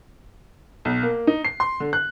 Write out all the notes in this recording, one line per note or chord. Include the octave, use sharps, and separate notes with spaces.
B1
A#3
D#4
C7
C6
D3
F#6